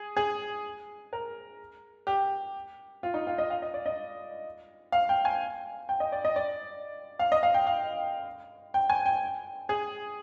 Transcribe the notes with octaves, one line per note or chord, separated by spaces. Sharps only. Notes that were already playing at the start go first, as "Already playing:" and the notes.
Already playing: G#4
G#4
A#4
G4
F4
D#4
F4
D#5
F5
D#5
D5
D#5
F5
G5
G#5
G5
D#5
D5
D#5
D5
F5
D#5
F5
G5
F5
G5
G#5
G5
G#4